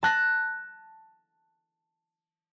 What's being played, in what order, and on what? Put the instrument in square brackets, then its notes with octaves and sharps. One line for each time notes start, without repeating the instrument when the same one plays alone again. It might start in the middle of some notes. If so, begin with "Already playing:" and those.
[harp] A5 F#6 A#6